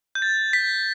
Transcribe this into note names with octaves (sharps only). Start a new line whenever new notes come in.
G6
A6
B6